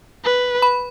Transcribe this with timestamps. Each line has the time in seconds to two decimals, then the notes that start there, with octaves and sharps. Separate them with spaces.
0.24 B4
0.62 B5